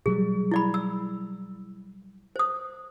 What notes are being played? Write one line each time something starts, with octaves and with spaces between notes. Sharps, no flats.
B2 F#3 G3 G#4
E4 D5 B5
E6
C5 D#6